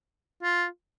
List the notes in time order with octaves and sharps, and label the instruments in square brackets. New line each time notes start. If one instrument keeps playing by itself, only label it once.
[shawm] F4